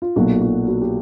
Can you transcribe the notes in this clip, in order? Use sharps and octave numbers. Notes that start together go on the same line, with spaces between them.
F4
B1 A#2 F#3 F#4
F4
F#4
F#4
G4